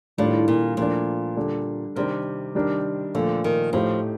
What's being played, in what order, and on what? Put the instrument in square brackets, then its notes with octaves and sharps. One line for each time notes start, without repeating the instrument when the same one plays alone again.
[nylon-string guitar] A2 [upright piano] D#3 G3 D4 F4
[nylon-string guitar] A#2
[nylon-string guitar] A#2 [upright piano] F3 A3 D4
[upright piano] D3 G3 D4 A4
[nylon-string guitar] C3 [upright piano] D#3 G3 D4 G4 A#4
[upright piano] D#3 G3 D4 G4 A#4
[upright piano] A#2 F3 A3 [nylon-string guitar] D3
[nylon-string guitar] D#3
[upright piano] A2 A3 D#4 G4 [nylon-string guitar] F3